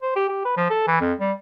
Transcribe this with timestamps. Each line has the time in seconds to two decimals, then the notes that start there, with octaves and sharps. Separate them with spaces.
0.02 C5
0.16 G4
0.29 G4
0.45 B4
0.57 F3
0.70 A4
0.87 E3
1.01 F2
1.20 G3